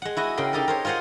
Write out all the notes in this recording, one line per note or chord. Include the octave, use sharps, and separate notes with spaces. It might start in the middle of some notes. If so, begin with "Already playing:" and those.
G#3 F#5
E4 F#4 D#5
C#3 A#4 G5 C6
D#4 G4 A4 A#4
A#4 C5 C#5
F4 G#4 C5 D#5 F#5